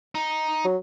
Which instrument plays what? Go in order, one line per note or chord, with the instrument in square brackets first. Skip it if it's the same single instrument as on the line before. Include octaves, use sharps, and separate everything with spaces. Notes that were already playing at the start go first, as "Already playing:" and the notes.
[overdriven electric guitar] D#4
[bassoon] F#3